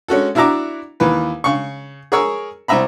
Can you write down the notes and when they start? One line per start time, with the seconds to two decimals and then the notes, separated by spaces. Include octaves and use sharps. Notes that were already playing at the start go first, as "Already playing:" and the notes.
0.08 G#3 C#4 F#4 A4
0.35 D4 E4 F#4 E5 A#5 D6
1.00 D#2 E3 B4
1.44 C#3 C#6
2.12 G#4 A#4 C#5 E6
2.68 C2 C4 E5 A#5 B5